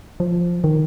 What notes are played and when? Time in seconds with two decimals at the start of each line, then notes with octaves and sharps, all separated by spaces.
0.20 F3
0.64 D#3